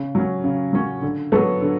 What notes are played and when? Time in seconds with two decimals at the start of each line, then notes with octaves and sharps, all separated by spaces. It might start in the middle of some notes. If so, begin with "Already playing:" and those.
Already playing: C#3
0.15 F#3 C#4
0.44 C#3
0.73 F#3 C#4
1.02 D3
1.32 F#3 B3 F#4 A4
1.62 D3